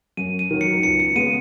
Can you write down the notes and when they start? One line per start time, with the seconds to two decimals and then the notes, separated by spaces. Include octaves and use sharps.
0.17 F#2 D#7
0.39 D#7
0.51 D#3 F#3
0.61 C#7
0.83 C#2 C#7
1.00 C#7
1.16 C#3 G#3 B3 D#7